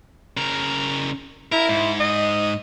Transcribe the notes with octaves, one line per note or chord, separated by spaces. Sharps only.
C#3 A#4
E4 A#4
G#2
D#5